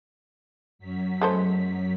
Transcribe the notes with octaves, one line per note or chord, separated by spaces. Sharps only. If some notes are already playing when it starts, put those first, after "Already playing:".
F#2 F#3 B6
G#3 A3 C5